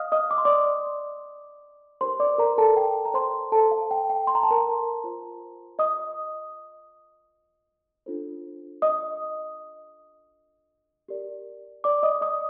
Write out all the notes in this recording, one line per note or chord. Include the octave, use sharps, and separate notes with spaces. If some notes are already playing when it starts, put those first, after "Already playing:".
Already playing: D#5 F5 D#6 F6
D#5 D#6
D6
C6
D5 D6
D#4 G4 A#4 C5 C6
D5 D6
A#4 A#5
A4 A5
G5
A#5
C5 C6
A4 A5
F5
G5
G5
C6
A#5
A5
A#4 A#5
F4 C5
D#5 D#6
D4 F4 A4 C5
D#5 D#6
G4 A#4 D5
D5 D6
D#5 D#6
D#5 D#6